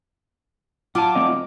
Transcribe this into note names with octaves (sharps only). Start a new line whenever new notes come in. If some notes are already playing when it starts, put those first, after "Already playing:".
F#3 F4 F#5 A5 D6
A3 C4 D#5